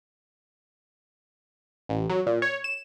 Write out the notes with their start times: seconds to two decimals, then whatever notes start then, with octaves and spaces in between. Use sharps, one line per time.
1.89 A1
2.10 F#3
2.27 A#2
2.42 C#5
2.64 E7